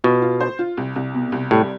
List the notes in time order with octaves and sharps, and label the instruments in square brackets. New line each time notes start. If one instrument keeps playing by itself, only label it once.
[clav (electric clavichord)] B2 [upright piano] F4
[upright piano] F4
C5
F4
C2
C2
B2
C2
[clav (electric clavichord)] A2 [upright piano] G3